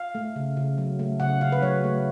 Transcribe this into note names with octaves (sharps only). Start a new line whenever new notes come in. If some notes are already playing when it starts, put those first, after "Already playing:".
Already playing: F5
A3
C#3
C#3
F#3
A3
C#3 F#5
C#3 F5
B4
F#3 C#5
A3